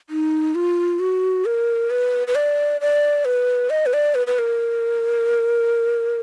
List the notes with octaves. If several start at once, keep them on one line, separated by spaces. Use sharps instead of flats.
D#4
F4
F#4
A#4
B4
B4
D5
D5
B4
D#5
B4
D5
B4
B4
A#4